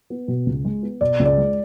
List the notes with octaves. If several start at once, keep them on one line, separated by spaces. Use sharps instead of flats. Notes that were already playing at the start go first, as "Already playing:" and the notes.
B3
B2
C#2
G#3
B3
B2 D5
C#2
D5
G#3